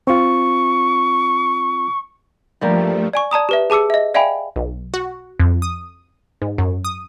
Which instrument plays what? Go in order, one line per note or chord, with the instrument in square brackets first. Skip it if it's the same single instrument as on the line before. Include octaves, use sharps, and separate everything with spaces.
[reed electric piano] C4 F4 [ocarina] C#6
[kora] G2 G3 A#3 [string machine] F3 A3
[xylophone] D5 G#5 C#6
D5 A5 A#5 D#6
G4 B4 E5
G#4 A5 D6 E6 C#7
D#5 E5
D5 E5 F5 G5 G#5 B5
[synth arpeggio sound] B1
F#4
F2
D#6
G#2
F#2
D#6